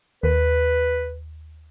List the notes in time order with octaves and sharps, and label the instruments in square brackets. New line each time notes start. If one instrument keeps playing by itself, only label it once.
[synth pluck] D#2 [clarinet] B4